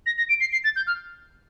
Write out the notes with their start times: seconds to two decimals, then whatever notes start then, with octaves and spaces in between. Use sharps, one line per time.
0.06 A#6
0.17 A#6
0.28 D7
0.40 C7
0.52 C7
0.63 A6
0.75 G6
0.86 F6